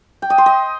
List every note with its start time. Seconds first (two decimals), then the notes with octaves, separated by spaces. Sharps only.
0.22 G5
0.30 D#5
0.38 C6
0.46 D#5